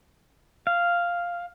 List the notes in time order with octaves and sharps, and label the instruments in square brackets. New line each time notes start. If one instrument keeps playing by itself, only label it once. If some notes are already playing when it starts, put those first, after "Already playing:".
[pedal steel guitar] F5